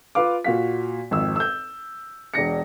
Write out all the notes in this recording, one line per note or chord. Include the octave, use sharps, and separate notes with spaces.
F4 B4 F5 D6
A#2 F#4 F5 B6
G#1 F2 E6
E6 G6
E1 D4 A#6 C#7